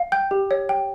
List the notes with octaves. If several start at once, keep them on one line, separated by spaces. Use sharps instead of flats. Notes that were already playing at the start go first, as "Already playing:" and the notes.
Already playing: F5
G5 G6
G4
C#5
G5